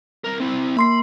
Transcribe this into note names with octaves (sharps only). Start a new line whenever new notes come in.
C2 A#4
C4 E4
A#3 B5 C6 C7